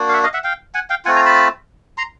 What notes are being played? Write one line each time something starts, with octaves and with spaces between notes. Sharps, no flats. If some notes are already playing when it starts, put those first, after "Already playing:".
Already playing: A#3 D4 F#4
F5
E5 F#5
D#5 F5
E5 F#5
F5 G5
F#5 G#5
F5 G5
A3 C4 F4 F#5 G#5
G#5 A#5
A5 B5
A#5 C6